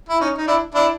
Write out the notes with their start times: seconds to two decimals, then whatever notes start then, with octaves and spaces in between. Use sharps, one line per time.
0.09 E4
0.21 C#4 D#4
0.38 D#4
0.47 D4 E4
0.75 D4 E4